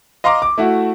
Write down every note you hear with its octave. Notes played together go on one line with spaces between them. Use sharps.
D#5 F5 A#5 C6 D6
D6
A3 E4 F#4